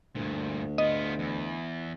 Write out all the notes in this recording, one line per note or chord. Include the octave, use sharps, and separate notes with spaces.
D2 G2 A#2
B3 F4 D#5
E2